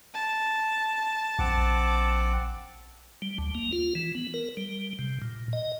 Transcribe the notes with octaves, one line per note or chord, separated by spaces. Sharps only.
A5
A#1 C4 F#5 D6
G3
D2
A#3
F4
E3
B3
A#4
G3
C3
A#2
D#5